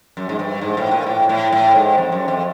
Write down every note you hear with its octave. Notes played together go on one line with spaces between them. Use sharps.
F#2
G#2
G2
G#2
A2
A#2
A2
A2
A2
G#2
F2
F#2
F2